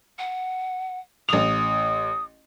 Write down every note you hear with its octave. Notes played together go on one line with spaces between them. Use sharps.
F#5
A1 D#6 F7